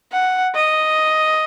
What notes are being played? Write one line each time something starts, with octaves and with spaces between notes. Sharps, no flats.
F#5
D#5